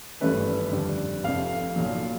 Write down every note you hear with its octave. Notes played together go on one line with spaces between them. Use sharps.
G#1 G2 E3 A3 C#4 B4
F2 D3 G3
F1 F2 C3 F5
B1 A#2 F#3